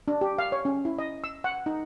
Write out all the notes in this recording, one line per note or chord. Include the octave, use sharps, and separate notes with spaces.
D4
G4
F5
C#5
C#4
E4
D#5
E6
F#5
D#4